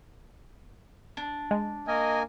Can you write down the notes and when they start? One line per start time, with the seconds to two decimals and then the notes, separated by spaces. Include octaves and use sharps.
1.17 D4
1.51 G#3
1.87 A#3 A#4 D#5 G#5